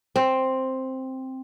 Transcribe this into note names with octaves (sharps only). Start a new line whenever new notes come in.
C4